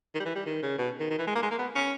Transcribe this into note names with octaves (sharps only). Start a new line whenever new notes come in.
D#3
G3
E3
G3
D#3
C#3
B2
D#3
D#3
E3
G#3
A#3
G#3
A#3
B3
C#4